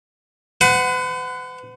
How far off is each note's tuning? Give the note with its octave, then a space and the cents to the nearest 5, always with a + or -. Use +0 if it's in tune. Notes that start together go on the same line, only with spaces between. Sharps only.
B4 +45 F#5 +0